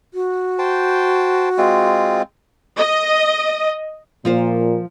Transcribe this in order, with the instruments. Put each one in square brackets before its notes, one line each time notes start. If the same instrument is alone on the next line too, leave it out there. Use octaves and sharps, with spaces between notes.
[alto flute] F#4
[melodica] C5 G5 A5
G#3 C4 F4
[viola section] D#5
[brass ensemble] A#2 [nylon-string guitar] F3 F4 C5